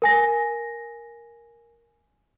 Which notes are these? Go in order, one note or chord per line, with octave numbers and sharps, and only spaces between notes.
A#4 G#5 A#6